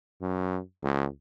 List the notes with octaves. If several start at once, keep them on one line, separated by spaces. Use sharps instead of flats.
F#2
C#2